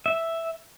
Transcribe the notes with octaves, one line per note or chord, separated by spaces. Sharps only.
E5